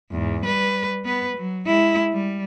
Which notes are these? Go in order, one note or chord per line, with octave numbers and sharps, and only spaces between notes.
E2 G#2
G3 B4
B3 B4
F#3
G#3 E4
G3